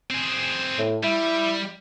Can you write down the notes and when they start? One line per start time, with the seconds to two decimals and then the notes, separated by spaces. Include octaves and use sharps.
0.11 C4 G#4
0.78 A2
1.04 G3 E4